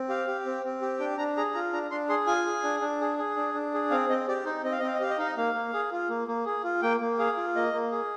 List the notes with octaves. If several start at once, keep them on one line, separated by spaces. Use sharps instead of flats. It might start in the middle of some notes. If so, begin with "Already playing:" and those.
Already playing: C4
G4 F5
G4
C4
C4
G4
D4 G5
D4 A#5
G#4 A#5
F4 A#5
D4 A#5
D4 C6
G#4 C6
F4 G#5
G#4
D4
D4
G#4
G#4
D4
D4
G#4
C4 F5
C4 D#5
G4 D5
D#4 C5
C4 D#5
F5
C4 D#5
F5
D#5
G4 F5
D#5
D#4 F5
D#5
A#3 F5
A#3
G#4
F4
A#3
A#3
G#4
F4
A#3 G5
A#3
G#4 F5
F4
A#3 D#5
A#3
G#4